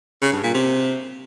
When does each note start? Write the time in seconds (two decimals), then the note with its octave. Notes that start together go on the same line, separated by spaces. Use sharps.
0.22 C#3
0.32 G2
0.43 A#2
0.54 C3